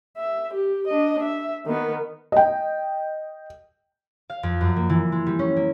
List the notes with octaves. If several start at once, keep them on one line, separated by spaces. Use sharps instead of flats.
E5
G4
D4 D#5
E5
D#3 B3
D#5 G5
F5
F2
F#2
A#3
E3
G#3
G3
C#4
A#3